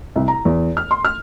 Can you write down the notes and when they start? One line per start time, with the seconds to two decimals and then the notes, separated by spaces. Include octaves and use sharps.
0.16 C2
0.28 A#5
0.45 E2
0.77 F6
0.91 C6
1.05 F6